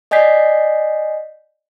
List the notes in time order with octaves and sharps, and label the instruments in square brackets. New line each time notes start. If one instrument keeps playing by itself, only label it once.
[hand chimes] D5 D#5 G#5 G6 B6 C7